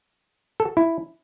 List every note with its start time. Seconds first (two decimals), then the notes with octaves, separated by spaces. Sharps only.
0.60 A4
0.77 E4